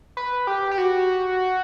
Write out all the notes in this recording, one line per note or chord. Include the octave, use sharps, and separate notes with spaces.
B4
G4
G4
F#4